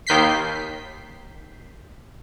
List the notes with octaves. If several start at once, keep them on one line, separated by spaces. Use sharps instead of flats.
D#2 D#3 G6 B6 C7